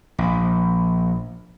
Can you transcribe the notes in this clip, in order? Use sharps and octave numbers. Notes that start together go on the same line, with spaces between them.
A#1